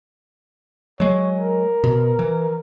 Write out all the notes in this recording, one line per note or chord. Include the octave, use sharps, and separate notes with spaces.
F#3 G#3 C#5
A#4
B2
E3